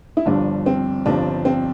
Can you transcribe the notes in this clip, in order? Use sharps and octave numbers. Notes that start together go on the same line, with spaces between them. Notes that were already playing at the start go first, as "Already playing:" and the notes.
E4
G1 G2 F3 D4
C4
G1 G2 F3 D4
C4